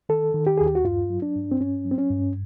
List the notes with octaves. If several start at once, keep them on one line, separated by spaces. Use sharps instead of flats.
D#3 A4
D#3
G4
D#2 G#4
G4
F#4
G2 F4
F#3
D4
G2
C4
G2 C#4
F#3
C4
C#4
G2